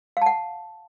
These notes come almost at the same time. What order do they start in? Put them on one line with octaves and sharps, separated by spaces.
F5 A5 F#5